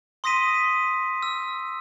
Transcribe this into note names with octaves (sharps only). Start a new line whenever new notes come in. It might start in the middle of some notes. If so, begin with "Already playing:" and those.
C6 D#6 A#6 B6 D#7
E6